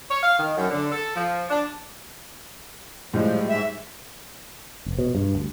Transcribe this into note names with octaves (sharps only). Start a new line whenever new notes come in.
C#5
F5
D#3
F#2
D3
A4
F3
D4
A2 F3 G3 G#3
G#2 E5
F1
B2
G2
D2